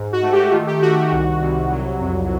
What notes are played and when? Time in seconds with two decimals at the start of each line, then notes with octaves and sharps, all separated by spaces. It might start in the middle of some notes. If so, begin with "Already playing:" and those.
Already playing: G#2
0.12 F#4
0.22 A3
0.32 G4
0.52 D#3 F4
0.67 G4
0.82 D#3 F#4
0.97 F#4
1.12 C2
1.42 C2
1.71 F#3
2.01 F2